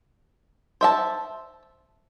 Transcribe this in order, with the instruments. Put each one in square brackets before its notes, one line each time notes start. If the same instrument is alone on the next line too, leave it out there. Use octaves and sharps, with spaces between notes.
[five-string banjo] C5 E5 A5